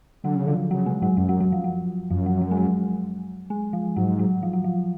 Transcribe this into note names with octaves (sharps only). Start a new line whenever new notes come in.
D3 F#3
C#3
D3 F3
C#3 F#3
B2 G#3
G#2 F#3
F#2 F#3
F#3
F#3
F3
F#3
F#2 F3
F#3
F#3
G#3
F#3
G#3
F3
G#2 F#3
F#3
F3
F#3
F3